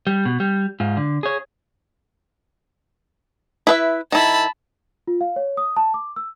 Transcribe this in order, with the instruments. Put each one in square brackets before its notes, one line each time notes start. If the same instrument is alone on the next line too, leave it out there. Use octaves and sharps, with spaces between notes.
[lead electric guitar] G3
B2
G3
G#2 F4
D3
G#4 C#5
[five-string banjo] E4 B4 E5
[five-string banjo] D#3 E4 [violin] A5 B5
[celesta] F4
F5
C#5
D#6
A5
D6
E6